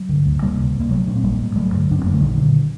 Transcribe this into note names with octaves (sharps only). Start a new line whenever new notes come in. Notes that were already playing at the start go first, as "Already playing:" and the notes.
Already playing: F#3
G2 D3
D2
C3 G3 A#3
D2
C3
A#3
A#1 F#3 A3
A#2 D4
C4
A#1 G3 A#3
A2
A1 F#3 A3
G2 D3
F#1 D4
C4
F#2 D3 A3 A#3
A#1 D#3 G3
A#2 D3 F#3